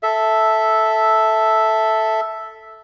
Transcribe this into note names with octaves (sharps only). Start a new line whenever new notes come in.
A4 E5